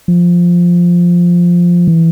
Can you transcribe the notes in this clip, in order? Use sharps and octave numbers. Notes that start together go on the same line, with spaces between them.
F3
E3